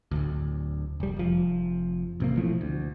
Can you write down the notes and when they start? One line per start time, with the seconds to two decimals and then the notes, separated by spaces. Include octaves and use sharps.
0.11 D1 G#1 D2
1.00 F1 G3
1.16 F1 F3
2.20 A1 C3 A#3
2.37 B2 E3 F3 A3
2.61 D2